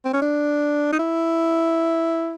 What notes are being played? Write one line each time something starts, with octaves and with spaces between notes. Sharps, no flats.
C4
C#4
D4
D#4
E4